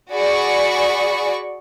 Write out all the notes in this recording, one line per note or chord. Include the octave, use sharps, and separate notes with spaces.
F#4 G#4 D5 B5 C#6